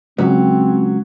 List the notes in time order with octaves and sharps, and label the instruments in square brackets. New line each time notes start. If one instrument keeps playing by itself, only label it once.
[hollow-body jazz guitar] C#2 [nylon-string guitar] F#3 [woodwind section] C4